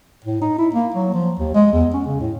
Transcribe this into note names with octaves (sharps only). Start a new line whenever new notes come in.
A2
D#4
E4
A#3
F#3
F3
D#2
G#3
E2
C#4
C#3
A2